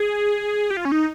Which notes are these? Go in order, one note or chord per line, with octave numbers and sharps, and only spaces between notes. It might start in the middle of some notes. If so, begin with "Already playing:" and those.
Already playing: G#4
G4
F4
C#4
D#4